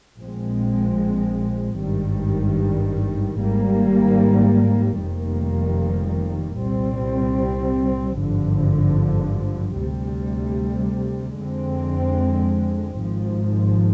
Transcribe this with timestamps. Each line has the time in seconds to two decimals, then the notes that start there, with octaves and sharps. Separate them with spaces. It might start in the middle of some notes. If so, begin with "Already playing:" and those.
0.18 A#1 A#2 F3 G#3 C4
1.77 G#1 G2 D#3 G3
3.38 G#1 G#2 G3 A#3
4.98 F1 F2 D#3 G3 A#3
6.58 C2 A#2 G3 C4
8.18 G#1 G2 D3 F3
9.78 D2 C3 G3
11.38 F2 D3 G#3 C4
12.98 G#1 G#2 F3